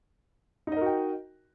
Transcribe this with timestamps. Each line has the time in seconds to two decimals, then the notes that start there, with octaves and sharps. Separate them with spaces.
0.67 D#4
0.72 D#5
0.77 A#4
0.81 F#4
0.86 G5